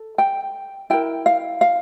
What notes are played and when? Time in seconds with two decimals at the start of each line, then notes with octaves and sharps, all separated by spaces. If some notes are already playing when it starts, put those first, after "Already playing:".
Already playing: A4
0.18 G5
0.90 E4 A#4 G5
1.26 F5
1.61 F5